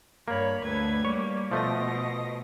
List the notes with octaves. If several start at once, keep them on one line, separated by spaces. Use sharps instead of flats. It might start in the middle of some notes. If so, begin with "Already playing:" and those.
G2 A#3 C#5 B5
D2 B4 G#6
G3 A#3 C#5
B2 F3 A3 D#5 A#6